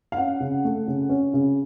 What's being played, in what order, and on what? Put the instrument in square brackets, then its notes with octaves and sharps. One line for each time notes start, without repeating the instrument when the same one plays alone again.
[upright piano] F5
C#4 F#5
C#3
A3
C#3
C#4
C#3